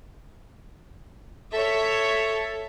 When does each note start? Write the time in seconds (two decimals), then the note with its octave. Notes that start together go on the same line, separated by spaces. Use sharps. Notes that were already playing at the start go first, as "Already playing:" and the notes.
1.53 A4 C#5 E5